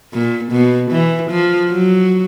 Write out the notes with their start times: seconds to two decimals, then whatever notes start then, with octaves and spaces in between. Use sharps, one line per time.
0.13 A#2
0.52 B2
0.91 E3
1.30 F3
1.70 F#3